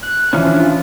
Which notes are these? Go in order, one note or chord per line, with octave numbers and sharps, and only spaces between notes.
F#6
E3 F3 C#4 D4
F4